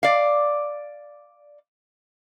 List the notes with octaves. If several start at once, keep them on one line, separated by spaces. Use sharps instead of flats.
D5 F5